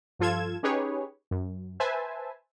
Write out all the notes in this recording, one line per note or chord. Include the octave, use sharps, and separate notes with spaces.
G2 F3 F4 A4 G#6 E7
C#4 D#4 G4 G#4 B4 C#5
F#2
B4 C5 E5 G#5 A5